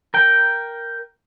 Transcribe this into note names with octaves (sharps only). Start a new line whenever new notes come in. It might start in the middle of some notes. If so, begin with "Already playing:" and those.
A#4 G5